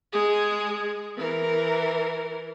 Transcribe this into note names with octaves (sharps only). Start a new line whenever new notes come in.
G#3 G#4
E3 A#4